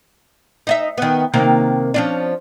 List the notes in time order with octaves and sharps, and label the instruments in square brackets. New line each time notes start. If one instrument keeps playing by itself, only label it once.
[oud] D#4 D#5 E5
D#3 B3
C3 D#3 A#3
F3 C#4 D4